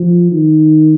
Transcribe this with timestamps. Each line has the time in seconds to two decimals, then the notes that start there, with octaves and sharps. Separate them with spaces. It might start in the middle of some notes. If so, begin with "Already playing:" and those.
Already playing: F3
0.31 D#3